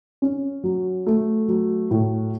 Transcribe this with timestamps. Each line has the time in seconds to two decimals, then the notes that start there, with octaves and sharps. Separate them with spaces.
0.22 C#4
0.64 F#3
1.06 A3
1.48 F#3
1.91 A2